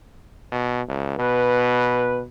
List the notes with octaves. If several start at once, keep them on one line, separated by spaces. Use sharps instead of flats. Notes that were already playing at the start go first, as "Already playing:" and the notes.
B2
C#2
B2 B4